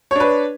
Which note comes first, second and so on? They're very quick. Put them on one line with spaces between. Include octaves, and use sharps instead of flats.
C#5 D4 B4